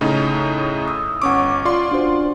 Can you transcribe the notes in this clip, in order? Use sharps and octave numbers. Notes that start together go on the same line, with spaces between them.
A2 C#3 D#4
D#6 E6
G1 C#4 F#5 C#6 D6
F4 D5 C6
D4 F#4 C5